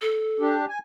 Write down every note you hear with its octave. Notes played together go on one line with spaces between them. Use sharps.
A4
D4 G4
G#5